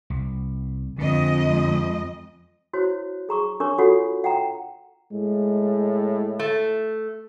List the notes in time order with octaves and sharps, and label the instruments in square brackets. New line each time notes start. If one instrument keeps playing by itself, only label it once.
[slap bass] C2
[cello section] F2 G#3 D#5 [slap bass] D3
[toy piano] E4 F#4 C5 C#5
G#4 A#5 C#6 D6
D4 A#4 C#5 C#6 D6
F4 F#4 A4 C#5 F#5
F#5 G5 A#5
[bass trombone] A2 [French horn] G#3
[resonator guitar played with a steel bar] A3